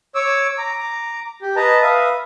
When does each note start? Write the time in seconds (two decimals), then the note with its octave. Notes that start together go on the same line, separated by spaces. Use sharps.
0.15 C#5 D6 E6
0.58 A#5 D6
1.42 G4
1.56 B4 D#5 A5 A#5
1.82 B4 E5 F5 D#6